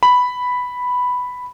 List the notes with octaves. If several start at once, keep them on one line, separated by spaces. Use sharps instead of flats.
B5